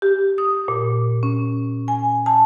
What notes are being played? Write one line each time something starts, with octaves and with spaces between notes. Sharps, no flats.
G4
D#6
A#2
C#4
G#5
A5